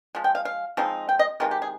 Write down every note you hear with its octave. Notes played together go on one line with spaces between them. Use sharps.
F3 G#3
G5
F5
F5
F3 G#3 C4 D#4
G5
D#5
C3 D#3 G#3 F4
G4
G#4